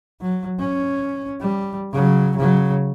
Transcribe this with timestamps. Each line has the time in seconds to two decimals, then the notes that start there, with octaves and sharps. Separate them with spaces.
0.21 F#3
0.59 C#4
1.41 G3
1.92 C#3 F#3
2.36 C#3 F#3